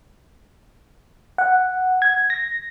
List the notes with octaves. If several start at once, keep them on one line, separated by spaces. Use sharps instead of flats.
F#5
G#6
A#6